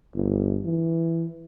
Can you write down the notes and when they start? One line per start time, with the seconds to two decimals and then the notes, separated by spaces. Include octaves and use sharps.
0.14 G1
0.65 E3